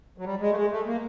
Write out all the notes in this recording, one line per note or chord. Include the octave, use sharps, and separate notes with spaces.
F#3
G3
G#3
A3
G#3
A3
A#3